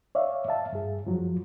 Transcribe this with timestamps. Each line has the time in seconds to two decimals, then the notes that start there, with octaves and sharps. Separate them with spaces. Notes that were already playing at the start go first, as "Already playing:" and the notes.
0.15 C#5 D5 E5 F5
0.48 E5 F5 A5
0.73 G2 G#4
1.05 F#2 F3 F#3